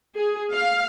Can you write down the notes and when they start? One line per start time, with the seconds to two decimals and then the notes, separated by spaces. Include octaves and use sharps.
0.16 G#4
0.52 F5